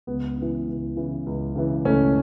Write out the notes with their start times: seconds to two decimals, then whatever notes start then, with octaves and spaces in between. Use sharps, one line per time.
0.07 C#2 B3
0.38 C#3 E3
0.67 C#2
0.96 C#3 E3
1.26 C#2
1.55 C#3 E3
1.85 C#2 A3 C#4